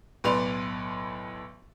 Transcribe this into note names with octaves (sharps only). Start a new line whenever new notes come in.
B1 A2 B4 D5 C6 F7